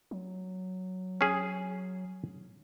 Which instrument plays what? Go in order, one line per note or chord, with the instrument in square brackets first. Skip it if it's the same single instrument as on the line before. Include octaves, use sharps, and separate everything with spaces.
[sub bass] F#3
[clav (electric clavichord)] C#4 G#4